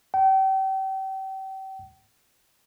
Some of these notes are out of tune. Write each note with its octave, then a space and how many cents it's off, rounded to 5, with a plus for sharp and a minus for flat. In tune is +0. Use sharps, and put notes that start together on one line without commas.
G5 -35